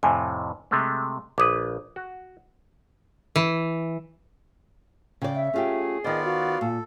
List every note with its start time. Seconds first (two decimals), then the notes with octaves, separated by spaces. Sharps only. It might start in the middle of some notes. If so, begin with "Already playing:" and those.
0.03 F2 A2 C3 G#5
0.71 C3 G#3 A3
1.38 A#1 B4 D6 D#6
1.96 F#4
3.36 E3
5.22 C#3 D5 G5
5.35 E5
5.54 A3 C#4 F4 G4 G#4
6.04 D#3 B3 F4 C5 D5 D#5
6.24 F#4 F5
6.61 A#2 A4